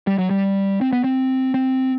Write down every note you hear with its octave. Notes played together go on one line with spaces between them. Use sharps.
G3
F#3
G3
C4
B3
C4
C4